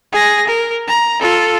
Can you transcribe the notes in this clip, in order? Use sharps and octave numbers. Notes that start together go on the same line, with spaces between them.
G#4 A#6
A#4
A#5
F4 A4